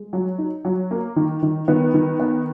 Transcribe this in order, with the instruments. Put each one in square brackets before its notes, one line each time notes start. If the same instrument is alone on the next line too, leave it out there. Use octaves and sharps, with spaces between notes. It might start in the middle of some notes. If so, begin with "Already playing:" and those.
Already playing: [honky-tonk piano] G#3
F#3
D#4
F#3
A#3
D#3
D#3
D#3 B3 B4
D#3
B3